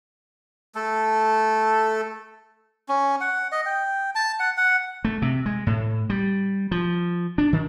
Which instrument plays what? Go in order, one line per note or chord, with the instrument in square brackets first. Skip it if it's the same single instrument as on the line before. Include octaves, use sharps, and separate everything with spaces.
[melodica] A3 A4
C#4
F#5
D#5
G5
A5
F#5
F#5
[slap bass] A3
C3
G#3
A2
G3
F3
D4
D#3